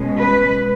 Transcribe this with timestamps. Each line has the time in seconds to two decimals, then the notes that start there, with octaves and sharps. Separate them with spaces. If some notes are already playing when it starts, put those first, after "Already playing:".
Already playing: B2 G#3 C#4
0.19 B4